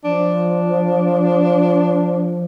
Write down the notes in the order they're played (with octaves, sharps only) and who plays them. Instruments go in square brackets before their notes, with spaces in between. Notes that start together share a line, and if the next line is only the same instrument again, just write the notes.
[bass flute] F3 [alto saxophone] D4